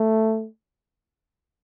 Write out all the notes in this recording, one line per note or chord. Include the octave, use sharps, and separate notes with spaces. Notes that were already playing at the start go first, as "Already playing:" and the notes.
Already playing: A3